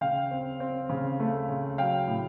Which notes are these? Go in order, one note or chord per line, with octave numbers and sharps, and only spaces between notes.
C#3 F5 G5
C4
C4
C#3
A3
C#3
F#3 F5 G5
A2